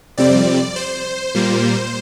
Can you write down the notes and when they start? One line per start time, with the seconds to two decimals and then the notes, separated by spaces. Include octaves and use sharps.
0.18 F2 C3 G3 C4 D5
0.76 C5
1.35 A#2 G3 A#3